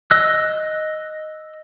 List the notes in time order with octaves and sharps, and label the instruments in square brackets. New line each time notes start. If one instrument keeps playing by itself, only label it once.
[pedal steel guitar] D#5 E6 F#6